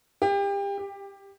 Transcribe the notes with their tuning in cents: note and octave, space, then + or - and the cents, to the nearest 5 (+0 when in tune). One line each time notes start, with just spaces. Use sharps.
G4 +30
G4 +10